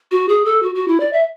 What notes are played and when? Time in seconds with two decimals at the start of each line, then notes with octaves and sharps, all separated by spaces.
0.11 F#4
0.29 G#4
0.45 A4
0.63 F#4
0.75 F#4
0.88 E4
1.00 D5
1.13 E5